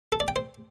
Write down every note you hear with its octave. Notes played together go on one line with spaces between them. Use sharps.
A4
D5
G5
C5